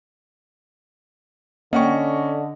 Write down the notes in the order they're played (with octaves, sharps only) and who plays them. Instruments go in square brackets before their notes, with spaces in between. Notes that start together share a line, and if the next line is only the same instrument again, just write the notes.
[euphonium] D3 [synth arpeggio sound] A#3 F#5 G5 [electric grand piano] C#4 C#6 [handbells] D#5